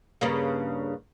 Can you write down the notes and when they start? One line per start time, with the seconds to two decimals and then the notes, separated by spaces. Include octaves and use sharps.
0.21 G2 C#3 A#3